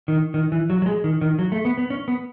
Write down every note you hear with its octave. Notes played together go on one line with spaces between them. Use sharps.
D#3
D#3
E3
F#3
F#3
G#3
D#3
D#3
F#3
A3
B3
B3
C#4
B3